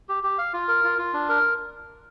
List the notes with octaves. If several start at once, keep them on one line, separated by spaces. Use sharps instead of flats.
G4
G4
F5
F4
A#4
F4
F4
D4
A#4